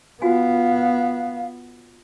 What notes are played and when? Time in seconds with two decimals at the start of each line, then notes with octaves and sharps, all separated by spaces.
0.22 B3 F4 F#4 F5 G#5